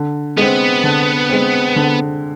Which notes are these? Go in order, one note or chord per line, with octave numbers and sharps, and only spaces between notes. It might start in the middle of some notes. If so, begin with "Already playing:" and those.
Already playing: D3
G#3 B3 C4
D3
G#3 C4
D3